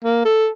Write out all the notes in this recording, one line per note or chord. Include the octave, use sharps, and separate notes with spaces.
A#3
A4